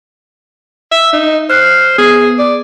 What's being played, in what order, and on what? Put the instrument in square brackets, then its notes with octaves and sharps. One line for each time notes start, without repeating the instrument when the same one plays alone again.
[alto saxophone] E5
D#4
[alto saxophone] C5 [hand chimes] F6 F#6 C7
[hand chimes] B3 [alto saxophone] G#4
[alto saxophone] D5